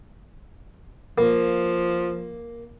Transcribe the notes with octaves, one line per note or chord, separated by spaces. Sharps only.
F3 A#3